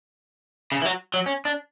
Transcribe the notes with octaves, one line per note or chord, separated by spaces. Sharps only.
C#3
E3
F#3
F#3
C#4
D4